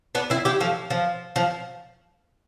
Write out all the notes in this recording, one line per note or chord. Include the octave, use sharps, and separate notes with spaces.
B3 D4
C4 E4
E4 G4
F3 A3
F3
F3